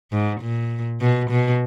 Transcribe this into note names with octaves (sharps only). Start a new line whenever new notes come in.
G#2
A#2
B2
B2